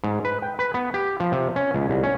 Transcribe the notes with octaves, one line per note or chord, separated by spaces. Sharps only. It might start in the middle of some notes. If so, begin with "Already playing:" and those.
G#2
B4
G5
B4
B3
G4
F3
C3
C#4
C#2
C2
C#4